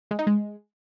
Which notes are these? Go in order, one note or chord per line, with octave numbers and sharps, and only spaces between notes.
G#3
D#4
G#3